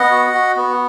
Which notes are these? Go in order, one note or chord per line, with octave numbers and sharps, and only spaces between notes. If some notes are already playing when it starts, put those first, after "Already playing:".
Already playing: B3 D#5 F#5
F#4
F#4
B3